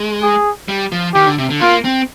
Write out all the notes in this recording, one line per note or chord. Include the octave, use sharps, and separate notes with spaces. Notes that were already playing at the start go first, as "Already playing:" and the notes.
Already playing: G#3
G#4
G3
F3
D#3 G4
D3
C3
D3
A#3 F4
C4